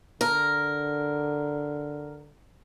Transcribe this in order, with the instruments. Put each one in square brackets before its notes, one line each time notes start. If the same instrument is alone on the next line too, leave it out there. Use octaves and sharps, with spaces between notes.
[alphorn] D3 [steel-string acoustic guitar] A#4